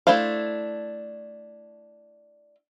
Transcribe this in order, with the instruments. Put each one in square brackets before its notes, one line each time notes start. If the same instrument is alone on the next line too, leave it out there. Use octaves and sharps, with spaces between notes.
[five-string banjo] A3 D4 E4 C5 F5